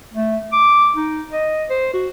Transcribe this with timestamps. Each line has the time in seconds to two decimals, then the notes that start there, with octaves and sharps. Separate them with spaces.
0.14 A3
0.53 D6
0.96 D#4
1.33 D#5
1.69 C5
1.94 F#4